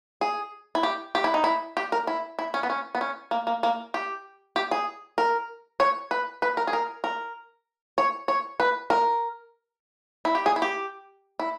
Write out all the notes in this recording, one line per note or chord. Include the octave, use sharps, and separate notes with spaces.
G#4
E4
G4
G4
E4
D#4
E4
G4
A#4
E4
E4
C#4
B3
C#4
B3
C#4
A#3
A#3
A#3
G4
G4
G#4
A#4
C#5
B4
B4
A#4
G#4
A#4
A#4
C#5
C#5
B4
A#4
E4
G4
G#4
E4
G4
E4